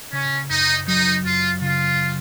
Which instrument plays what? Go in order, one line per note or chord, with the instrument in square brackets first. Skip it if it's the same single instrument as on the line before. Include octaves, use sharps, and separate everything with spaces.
[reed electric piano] C#3 [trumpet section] C#4
[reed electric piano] F#2 [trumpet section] D#4
[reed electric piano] F#3 [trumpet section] D#4
[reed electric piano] F#2 [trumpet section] F4
[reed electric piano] C#3 [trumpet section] F4